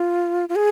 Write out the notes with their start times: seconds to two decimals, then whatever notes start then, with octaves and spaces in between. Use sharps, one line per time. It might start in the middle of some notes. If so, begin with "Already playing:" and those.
Already playing: F4
0.49 F4
0.56 G#4